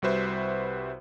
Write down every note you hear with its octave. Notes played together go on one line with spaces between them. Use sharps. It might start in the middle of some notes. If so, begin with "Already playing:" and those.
C2 G3 F#4 B4 C5 E5